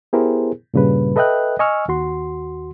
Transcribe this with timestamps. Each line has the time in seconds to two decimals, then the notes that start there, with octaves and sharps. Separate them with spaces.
0.13 B3 E4 G4 G#4 A#4 C5
0.74 G2 A#2 C#3 G3 B4
1.16 A4 B4 D#5 E5 G5 F#6
1.59 D#5 G#5 C#6 E6 F6
1.88 D#2 F#4 C6